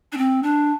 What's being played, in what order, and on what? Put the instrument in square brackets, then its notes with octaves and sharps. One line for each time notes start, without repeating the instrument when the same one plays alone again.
[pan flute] D4
C4
D4